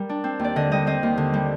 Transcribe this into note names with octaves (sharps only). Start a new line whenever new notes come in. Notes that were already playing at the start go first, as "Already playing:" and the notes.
Already playing: G3 A#4
D4
C4
D#2 D5
D3 D#5
G3 D#5
C4 D#5
D#2
D3
G3